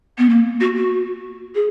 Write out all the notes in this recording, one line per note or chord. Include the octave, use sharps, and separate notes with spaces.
B3
A#3
F#4
F#4
G#4